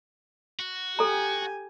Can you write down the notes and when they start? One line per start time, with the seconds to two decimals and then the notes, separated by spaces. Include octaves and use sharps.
0.59 F#4
0.99 G4 A4 G#5 A#5